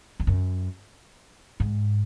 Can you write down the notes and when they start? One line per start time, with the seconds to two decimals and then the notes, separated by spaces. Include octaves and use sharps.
0.20 F2
0.27 F#2
1.60 G#2